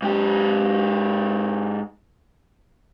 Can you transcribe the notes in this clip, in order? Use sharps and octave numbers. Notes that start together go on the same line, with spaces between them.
G#2 G4